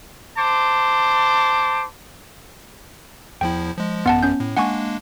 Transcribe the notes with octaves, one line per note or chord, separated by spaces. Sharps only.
C5 A5 D6
E2 F3 E4 G5
F3 G#3
A1 F#2 B3 F#5 A5
C#4 G6
A2
G#3 A#3 D4 F#5 G#5 C#6